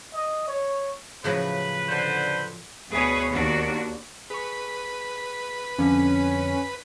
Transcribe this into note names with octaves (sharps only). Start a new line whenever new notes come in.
D#5
C#5
A2 C#3 F3 F#3 B4
D3 C5
D2 B2 G#4 B4 C#5
D#2 D4 F#4
G#4 B4 C#6
F2 D3 C#4